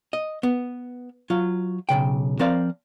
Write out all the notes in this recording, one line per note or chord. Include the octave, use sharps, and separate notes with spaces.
D#5
B3
F#3 F4
B1 E2 C#3 G5
F3 C4 A#4 C5 D5 F5